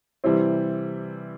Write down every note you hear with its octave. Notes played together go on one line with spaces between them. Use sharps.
C3 E3 G3 C4 E4